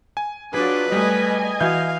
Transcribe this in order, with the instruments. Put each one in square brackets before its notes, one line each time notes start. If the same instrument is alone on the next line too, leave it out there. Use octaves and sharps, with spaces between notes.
[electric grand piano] G#5
[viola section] F#3 D4 F4 [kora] G#4 [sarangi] B4
[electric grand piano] G3 A3 [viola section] D#5 G#5
[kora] E3 F#4 [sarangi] F5 [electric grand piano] G6